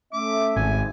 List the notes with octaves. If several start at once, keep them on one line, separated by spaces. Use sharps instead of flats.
A3 C#4 E5 D6
G#1 G#5